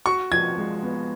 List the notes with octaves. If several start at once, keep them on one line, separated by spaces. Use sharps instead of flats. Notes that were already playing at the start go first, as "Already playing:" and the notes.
F#4 C#6
F3 G#6
G#3
B3